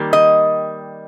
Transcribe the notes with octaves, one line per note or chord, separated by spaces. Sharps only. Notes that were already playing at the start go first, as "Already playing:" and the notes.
Already playing: D#3 G3 A#3
D#5